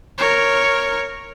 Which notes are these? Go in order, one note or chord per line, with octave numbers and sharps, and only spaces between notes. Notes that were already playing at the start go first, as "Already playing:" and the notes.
A#4 C#5